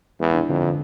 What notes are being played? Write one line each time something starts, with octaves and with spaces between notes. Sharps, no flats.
E2 G#3
D4
F2 D3
D3